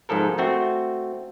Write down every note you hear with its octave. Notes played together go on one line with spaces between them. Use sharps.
G#2 C3 F3 A4 A#4
A3 C4 F#4